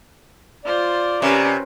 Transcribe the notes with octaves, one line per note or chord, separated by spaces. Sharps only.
F4 C5 D5
C3 C#4 A#4 B4